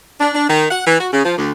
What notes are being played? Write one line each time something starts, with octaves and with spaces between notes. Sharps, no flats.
D4
D4
D#3
F#5
E3
F#4
C#3
F3
D2